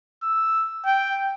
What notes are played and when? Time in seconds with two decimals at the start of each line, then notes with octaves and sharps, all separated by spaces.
0.23 E6
0.85 G5